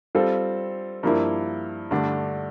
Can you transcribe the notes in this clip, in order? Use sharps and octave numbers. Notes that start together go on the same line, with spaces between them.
G3 C4 F4 A4
G2 F3 A#3 E4
G2 D3 A3 D4